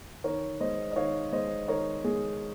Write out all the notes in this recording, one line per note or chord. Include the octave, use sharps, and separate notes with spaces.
D#3 A#4 C#5
G#3 C5 D#5
D#5
D#3 C#5 F5
G#3 C5 D#5
D#3 A#4 C#5
G#3 G#4